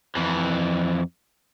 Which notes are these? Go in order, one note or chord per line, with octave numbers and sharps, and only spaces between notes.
F2 E3